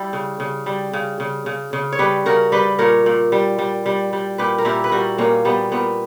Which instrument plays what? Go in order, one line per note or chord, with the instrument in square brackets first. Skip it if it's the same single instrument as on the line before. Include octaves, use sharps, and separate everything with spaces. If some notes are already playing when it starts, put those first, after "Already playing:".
Already playing: [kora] G3 E4 G4
C#3
C#3
G3
C#3
C#3
C#3
C#3
C#5
G3 G4 B4
C#3 F#4 A#4
G3 G4 B4
A#2 A#4 C#5
A#2
G3
G3
G3
G3
A#2 G4 B4
A#4
A#2 E4 G4
B4
G3 F#4 A#4
A#2 A#3 C#4
G3 B3
A#2 B3